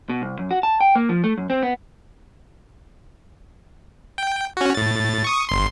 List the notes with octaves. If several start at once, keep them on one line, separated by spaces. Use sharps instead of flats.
B2
C2
F#2
F#4
A5
G5
A#3
F3
A3
F#2
C4
B3
G5
C#4 F#4
A2 A6
C#6 D#6
G1 C6